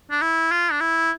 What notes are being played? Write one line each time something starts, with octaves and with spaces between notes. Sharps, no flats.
D4
E4
F4
D4
E4